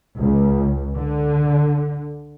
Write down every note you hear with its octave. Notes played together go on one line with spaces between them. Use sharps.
C#2
D3